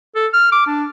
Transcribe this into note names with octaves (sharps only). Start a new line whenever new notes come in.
A4
F6
D6
D4